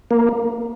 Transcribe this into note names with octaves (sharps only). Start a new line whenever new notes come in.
A#3